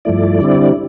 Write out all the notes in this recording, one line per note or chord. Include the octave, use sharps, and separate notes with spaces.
G2 F3 A3 E4 D5
D3 G3 C4 E4